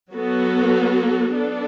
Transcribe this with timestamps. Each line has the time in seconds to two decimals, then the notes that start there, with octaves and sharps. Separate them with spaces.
0.14 F#3 B3 F#4 A4
1.34 B3 D4 A4